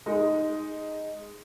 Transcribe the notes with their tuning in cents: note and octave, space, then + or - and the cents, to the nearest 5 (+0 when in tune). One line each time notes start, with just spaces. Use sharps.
G#3 +0 D#4 +0